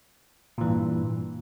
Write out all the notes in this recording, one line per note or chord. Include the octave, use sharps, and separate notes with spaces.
G2 A#2 E3